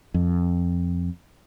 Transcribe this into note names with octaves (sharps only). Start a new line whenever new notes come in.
F2